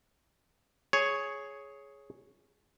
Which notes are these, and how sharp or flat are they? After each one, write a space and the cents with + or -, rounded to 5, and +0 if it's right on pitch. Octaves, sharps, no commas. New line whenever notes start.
G#4 +10 C#5 +0